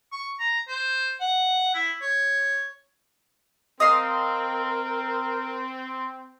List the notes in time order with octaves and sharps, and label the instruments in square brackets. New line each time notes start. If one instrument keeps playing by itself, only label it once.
[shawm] C#6
A#5
C5
F#5
E4
C#5
[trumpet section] C4 [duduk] A#4 [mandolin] D#5 F5 C6 [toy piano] D#6